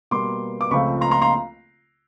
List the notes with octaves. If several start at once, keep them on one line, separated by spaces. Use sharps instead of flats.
B2 G3 A#3 C6 D6
D6
C#2 C#3 F3 A3 C4 B5 C#6
A#5 C6
A#5 C6
A#5 C6